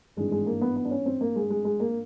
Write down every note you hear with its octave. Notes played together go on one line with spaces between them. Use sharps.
G#1 G2 E3 G#3
G#3
A#3
B3
B3
D4
C#4
C4
A#3
G#3
G#3
G#3
A#3